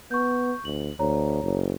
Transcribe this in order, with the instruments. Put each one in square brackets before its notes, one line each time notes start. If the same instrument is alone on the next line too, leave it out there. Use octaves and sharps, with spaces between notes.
[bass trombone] B3 [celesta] C#6 G6
[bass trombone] D2 [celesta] F#7
[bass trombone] D2 [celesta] C#5 A#5
[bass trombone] F#1